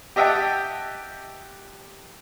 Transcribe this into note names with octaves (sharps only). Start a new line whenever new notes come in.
G4 D#5 E5 F#5 G5 A5